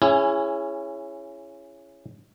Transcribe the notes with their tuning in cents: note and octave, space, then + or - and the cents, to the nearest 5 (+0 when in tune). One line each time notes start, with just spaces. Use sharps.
C#4 +0 E4 +25 G#4 -15